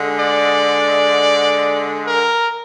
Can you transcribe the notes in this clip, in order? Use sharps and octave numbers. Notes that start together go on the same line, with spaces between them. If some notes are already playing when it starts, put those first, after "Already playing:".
Already playing: D3 G#3
D5
A#4